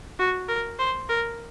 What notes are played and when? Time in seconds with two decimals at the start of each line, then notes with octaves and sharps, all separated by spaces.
0.19 F#4
0.49 A#4
0.79 C5
1.09 A#4